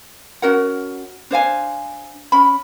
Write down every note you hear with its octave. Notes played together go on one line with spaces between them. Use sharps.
C#4 F#4 A#4 F#5
D4 C5 F5 G#5
C#4 B5